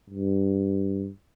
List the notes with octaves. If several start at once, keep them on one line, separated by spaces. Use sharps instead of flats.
G2